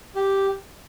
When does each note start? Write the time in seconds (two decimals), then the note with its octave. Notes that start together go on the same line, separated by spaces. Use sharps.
0.16 G4